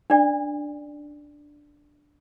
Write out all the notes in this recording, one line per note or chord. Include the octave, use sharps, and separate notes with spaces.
C#4 D4 D5